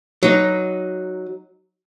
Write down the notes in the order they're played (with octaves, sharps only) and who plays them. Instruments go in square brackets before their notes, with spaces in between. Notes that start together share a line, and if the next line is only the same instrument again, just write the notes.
[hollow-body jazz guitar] F#3 D#4